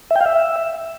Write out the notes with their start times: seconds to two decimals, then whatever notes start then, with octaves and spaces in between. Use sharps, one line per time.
0.10 E5
0.16 G5
0.21 F5
0.26 E5